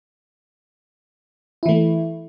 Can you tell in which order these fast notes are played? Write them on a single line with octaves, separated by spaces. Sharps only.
E4 E3 A3